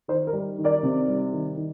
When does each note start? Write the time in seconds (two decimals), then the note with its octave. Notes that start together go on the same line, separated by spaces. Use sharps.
0.08 D#3 C5
0.27 A#4
0.33 G3
0.58 D#3
0.64 A#4 D5
0.83 C3
1.08 G3
1.32 D#3
1.57 D#3